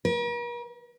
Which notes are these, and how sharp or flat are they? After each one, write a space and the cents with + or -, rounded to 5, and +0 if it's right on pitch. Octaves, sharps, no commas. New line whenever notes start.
A#4 +45